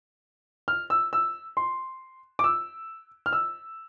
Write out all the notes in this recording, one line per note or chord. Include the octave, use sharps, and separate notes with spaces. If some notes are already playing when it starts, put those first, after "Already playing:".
F6
E6
E6
C6
D6
E6
F6
E6